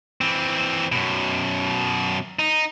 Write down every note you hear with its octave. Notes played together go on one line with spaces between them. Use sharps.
E3 C4
F#2 B2
D#4